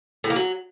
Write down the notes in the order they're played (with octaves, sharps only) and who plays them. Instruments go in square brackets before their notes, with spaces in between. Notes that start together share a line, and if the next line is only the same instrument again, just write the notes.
[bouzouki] A2
A#3
F#3